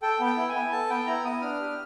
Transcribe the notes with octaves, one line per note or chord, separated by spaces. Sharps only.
A4 G5
B3
G5
E4
G#5
B3
A4 A5
B3 G5
E4 A#5
B3 D#6
D4 F6
G4